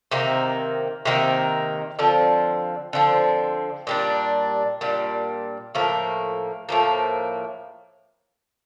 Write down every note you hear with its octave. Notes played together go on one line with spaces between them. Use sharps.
C3 D#3 A#3
C3 D#3 A#3
D3 F3 C4
D3 F3 C4
A#2 G3 D4
A#2 G3 D4
A2 F3 A#3
A2 F3 A#3